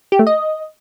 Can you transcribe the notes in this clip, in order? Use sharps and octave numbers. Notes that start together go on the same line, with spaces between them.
G4
A3
D#5